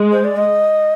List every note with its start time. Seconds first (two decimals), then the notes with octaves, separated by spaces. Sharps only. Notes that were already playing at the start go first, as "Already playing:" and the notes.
Already playing: G#3
0.12 C5
0.24 D5
0.36 D#5